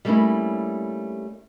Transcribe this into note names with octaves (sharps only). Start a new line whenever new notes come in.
G3 A3 A#3 C#4 D4 E4